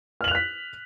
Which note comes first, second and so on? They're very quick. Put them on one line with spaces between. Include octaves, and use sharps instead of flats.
F6 F#7 F7 F#6 B6